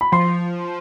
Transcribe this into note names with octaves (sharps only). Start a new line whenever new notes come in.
B5
F3 C6